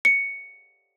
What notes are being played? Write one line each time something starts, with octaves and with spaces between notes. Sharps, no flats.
C#7